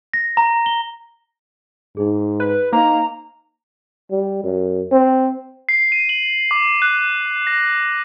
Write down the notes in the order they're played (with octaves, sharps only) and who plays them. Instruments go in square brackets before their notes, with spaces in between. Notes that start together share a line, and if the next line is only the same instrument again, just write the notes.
[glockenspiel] A#6
A#5
G7
[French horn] G#2 [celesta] D#4 G#4
[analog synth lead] B4
[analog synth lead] A#3 [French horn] D#4 [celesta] C5 F5 [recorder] A#5
[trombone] G3
F#2
C4
[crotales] C7
D#7
F#7
D6
F#6
A#6